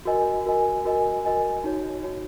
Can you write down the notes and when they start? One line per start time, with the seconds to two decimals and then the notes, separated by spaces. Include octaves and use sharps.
0.05 F#4 A#4 D#5 G#5
0.46 F#4 A#4 D#5 G#5
0.85 F#4 A#4 D#5 G#5
1.25 F#4 A#4 D#5 G#5
1.64 D#4 F#4 C#5
2.03 D#4 F#4 C#5